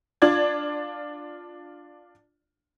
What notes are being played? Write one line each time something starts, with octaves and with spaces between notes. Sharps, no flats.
D4 F4 D5 G#6